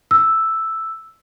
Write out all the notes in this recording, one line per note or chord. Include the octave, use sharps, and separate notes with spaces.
E6